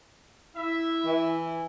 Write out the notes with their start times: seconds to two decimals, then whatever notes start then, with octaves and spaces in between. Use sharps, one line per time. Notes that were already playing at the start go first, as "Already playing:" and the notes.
0.56 E4 E5
1.06 E3